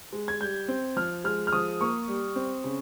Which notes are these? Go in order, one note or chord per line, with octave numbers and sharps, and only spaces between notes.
G#3
G#6
G3 G6
C4
F3 F6
G#3 F6
F6
F3 D#6
A#3 C#6
G3
C4
C#3